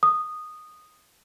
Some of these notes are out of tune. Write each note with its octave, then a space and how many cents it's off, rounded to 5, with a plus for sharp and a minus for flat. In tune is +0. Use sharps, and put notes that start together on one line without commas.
D#6 -10